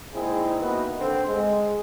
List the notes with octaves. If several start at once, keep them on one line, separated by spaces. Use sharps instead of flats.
A#2 G#3 C4 D#4 E4 G#4
A#3 B3 D#4 E4 F#4 B4
D3 C4
G#3